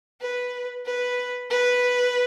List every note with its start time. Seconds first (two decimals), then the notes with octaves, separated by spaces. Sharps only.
0.21 B4
0.85 B4
1.50 B4